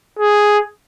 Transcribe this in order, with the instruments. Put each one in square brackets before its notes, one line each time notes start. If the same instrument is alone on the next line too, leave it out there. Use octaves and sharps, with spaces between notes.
[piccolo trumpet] G#4